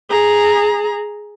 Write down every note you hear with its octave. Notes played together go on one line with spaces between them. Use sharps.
G#4 A#5